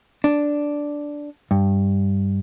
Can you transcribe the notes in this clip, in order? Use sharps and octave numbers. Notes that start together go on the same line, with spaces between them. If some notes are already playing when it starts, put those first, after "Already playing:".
D4
G2